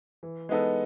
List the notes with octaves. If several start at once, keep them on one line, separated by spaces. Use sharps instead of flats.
E3
G#3 B3 D#4 A4